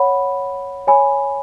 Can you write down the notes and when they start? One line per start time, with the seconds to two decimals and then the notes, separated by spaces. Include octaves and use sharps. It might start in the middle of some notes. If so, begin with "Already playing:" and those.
Already playing: C#5 F#5 B5
0.87 C#5 G#5 B5